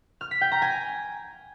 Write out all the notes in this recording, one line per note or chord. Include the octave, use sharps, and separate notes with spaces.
F6
B6
G5
A#5
G#5